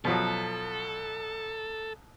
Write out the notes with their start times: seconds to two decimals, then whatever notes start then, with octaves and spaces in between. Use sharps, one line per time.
0.05 B2 F3 F#3 A4